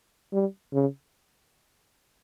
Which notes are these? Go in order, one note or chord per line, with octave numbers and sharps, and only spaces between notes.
G3
C#3